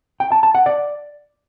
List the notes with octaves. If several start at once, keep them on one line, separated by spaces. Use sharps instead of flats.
G5
A5
A5
F#5
D5